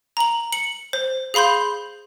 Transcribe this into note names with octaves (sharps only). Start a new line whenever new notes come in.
A#5 F#7
C#7 F#7
C5
G#4 F5 B5 C6 G6